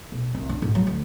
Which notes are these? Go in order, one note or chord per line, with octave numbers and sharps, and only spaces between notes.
B1
C2
D4
G#2
F#3
D2